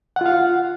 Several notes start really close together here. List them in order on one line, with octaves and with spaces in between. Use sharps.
F#5 F4 F5